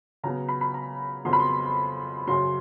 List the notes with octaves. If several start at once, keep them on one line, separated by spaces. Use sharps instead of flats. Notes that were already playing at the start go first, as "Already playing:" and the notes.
C#3 F#3 B3 A#5
B5
B5
A#5
F2 C#3 F#3 B3 C6
B5
C6
F#2 C#3 F#3 C6